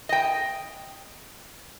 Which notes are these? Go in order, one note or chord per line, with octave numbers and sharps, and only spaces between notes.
D#5 G5